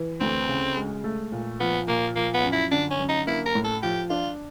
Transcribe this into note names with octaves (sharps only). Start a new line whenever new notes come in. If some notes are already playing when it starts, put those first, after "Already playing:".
Already playing: E3
D2 C4
C#3
G#3
A3
A#2
F3 B3
A#2 A#3
F3 A#3
B3
F#2
E4
D3 D4
C#4
F#2
D#4
A#3 E4
A#4
A2
A4
F3 G4
D4 F4